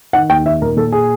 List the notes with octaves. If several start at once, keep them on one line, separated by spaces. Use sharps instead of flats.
D#3 F#5
D#2 G5
D#3 E5
A#2 A#4
A#2 A4
G#4